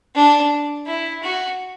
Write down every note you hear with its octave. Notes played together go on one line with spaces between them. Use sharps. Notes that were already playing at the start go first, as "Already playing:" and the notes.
D4
E4
F#4